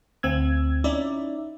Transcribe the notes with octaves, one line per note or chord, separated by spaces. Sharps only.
D2 C4 E6 G#6
C#4 D#4 E4 D5 E5